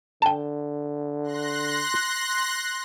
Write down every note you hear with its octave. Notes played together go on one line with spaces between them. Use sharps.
D3 G5 A5
C6 F#6 A#6